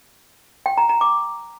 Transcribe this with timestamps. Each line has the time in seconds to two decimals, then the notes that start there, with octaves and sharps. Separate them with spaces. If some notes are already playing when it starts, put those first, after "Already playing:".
0.66 G5
0.77 A#5
0.89 A#5
1.01 D6